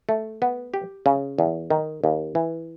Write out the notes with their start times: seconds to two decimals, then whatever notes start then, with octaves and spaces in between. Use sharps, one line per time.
0.09 A3
0.42 B3
0.74 G4
1.06 C#3
1.38 E2
1.70 D#3
2.04 D#2
2.35 E3